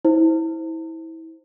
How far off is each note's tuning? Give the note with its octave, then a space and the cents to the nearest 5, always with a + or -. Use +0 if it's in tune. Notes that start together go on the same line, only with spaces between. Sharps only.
E4 -25 C5 +0